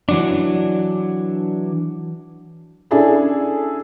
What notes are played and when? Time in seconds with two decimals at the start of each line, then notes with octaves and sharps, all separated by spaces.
0.09 E3 F#3 D4
2.91 C#4 D4 E4 G#4 A4